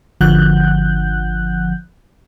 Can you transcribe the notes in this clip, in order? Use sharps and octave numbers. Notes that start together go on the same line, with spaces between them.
G#1 D3 F3 F#5 F#6 G6